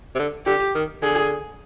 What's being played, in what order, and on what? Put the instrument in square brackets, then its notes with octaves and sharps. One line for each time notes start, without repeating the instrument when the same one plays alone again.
[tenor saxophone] C3
D3
[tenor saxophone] D3 [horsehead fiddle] G4
[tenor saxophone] D#3
[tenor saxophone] D3 [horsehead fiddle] G#4